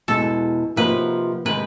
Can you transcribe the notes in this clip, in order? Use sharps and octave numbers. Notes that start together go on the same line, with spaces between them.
E2 B2 G#3 A4
C3 F3 A#3 D#4 F#4 B4
C3 D#3 G#3 B4